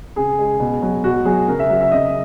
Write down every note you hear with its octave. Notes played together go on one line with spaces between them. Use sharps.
C#3 G#4
G#3
B2
F#3
B2 F#4
F#3 G#4
C#3 A#4
E5
F#3
E5
C#3 D#5